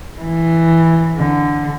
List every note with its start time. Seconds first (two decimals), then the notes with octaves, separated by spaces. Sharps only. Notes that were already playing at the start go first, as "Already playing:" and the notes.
0.20 E3
1.16 D3